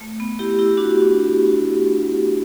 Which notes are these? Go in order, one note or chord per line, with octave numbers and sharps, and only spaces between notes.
A3
B3
E4 G4
E4 G4
D4 F#4